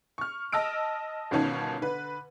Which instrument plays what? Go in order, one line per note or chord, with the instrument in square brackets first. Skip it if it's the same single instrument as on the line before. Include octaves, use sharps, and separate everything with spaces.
[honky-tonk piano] C#6 F6
D#5 A5 E6 F6 D7
G1 B2 D#3 C#4 A5
D3 B4